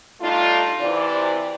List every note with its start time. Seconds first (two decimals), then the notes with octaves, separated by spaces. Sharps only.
0.21 G3 A3 D4 D#4 F4
0.80 C3 E3 D5